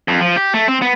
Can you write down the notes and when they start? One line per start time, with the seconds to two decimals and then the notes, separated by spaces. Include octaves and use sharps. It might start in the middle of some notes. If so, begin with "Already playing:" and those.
0.08 F2
0.21 F3
0.36 G4
0.54 A3
0.68 C4
0.82 B3